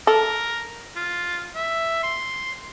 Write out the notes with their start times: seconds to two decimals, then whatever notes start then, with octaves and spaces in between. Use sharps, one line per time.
0.07 A4 A#4
0.96 F4
1.55 E5
2.03 C6